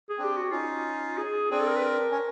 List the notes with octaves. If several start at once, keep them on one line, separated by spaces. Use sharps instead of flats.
G#4
C4 D4
G4
F#4
C#4 D#4 F4
G#4
C4 D4 G#4
A4
A#4
B4
A#4
C#4